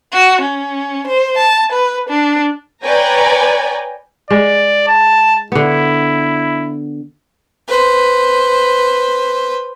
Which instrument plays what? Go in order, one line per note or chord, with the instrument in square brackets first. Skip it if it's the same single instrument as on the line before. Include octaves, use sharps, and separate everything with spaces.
[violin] F#4
C#4
C5
A5
B4
D4
[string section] B4 C#5 D5 G5 G#5 A#5
[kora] G#3 [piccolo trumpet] D5
[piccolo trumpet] A5
[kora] D3 B3 [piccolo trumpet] E4
[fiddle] B4 C5